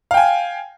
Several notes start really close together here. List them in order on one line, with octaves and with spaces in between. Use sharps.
F5 G5 G#5